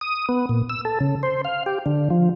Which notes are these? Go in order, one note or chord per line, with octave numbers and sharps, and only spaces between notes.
D#6
B3
A#2
E6
A4
C#3
C5
F5
G4
D3
F3